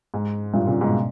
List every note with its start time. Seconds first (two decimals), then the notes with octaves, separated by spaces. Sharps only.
0.14 G#2
0.54 G2 A#2
0.67 A#2 C#3
0.81 G#2 B2